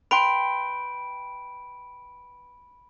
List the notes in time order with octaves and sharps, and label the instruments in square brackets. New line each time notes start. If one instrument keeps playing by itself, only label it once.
[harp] B4 G5 C6 [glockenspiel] B5 D7